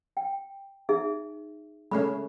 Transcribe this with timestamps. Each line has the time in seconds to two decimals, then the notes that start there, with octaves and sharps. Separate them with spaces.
0.17 G5
0.89 D#4 G#4 E5
1.91 G#3 A3 C#4 B5